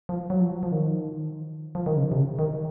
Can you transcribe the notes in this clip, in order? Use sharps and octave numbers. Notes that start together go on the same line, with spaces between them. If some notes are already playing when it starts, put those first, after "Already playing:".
F3
F#3
F3
F3
D#3
F3
D#3
C#3
C3
C#3
D#3